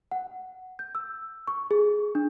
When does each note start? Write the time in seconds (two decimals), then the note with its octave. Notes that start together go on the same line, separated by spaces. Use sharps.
0.11 F#5
0.79 G6
0.95 E6
1.47 C#6
1.71 G#4
2.15 D4